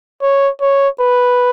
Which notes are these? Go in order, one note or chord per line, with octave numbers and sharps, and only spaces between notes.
C#5
C#5
B4